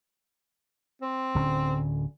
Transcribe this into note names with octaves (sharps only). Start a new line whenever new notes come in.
C4
D1 D3 C#4